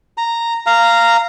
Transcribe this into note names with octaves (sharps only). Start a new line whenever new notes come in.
A#5
F5 A#5